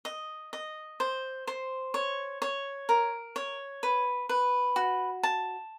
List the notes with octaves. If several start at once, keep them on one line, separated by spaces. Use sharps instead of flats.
D#5
D#5
C5
C5
C#5
C#5
A#4
C#5
B4
B4
F#4
A5